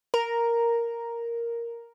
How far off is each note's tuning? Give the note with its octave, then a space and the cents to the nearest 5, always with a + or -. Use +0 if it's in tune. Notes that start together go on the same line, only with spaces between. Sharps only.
A#4 +0 A#5 +0